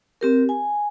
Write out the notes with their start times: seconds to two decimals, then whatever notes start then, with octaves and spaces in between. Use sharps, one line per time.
0.21 C4 G4 A#4
0.49 G#5